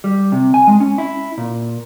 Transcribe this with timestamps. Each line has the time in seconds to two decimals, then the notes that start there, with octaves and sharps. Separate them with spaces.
0.04 G3
0.32 C3
0.54 G#5
0.67 G#3
0.80 C#4
0.98 E4
1.38 A#2